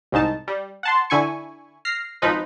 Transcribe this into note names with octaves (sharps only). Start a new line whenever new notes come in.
C2 G#2 D#4 A5
G3
F#5 A5 C6
D3 E4 G#5 C#6
F6 A#6 C7
G#1 F3 D#4 B4